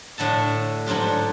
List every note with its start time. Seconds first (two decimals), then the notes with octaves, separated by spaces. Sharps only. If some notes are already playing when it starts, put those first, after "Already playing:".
0.18 A2 D3 A4 A5
0.86 G#2 F#3 D4 F4 G4